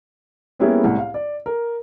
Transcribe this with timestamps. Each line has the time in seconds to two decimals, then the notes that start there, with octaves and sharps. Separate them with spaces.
0.59 G3 A#3 B3 C#4 E4 G#4
0.84 C2 A2
0.99 F5
1.14 D5
1.46 A#4